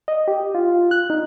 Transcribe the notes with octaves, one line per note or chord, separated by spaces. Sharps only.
D#5
G4
F4
F#6
D#4